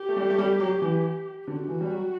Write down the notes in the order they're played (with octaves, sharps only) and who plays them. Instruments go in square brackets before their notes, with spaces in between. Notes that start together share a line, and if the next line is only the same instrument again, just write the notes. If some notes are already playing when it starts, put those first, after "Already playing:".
Already playing: [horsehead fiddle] G4
[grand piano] A3
G3
A3
G3
F#3
E3
[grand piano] D3 [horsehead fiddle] F#4
[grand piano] E3
G3
F#3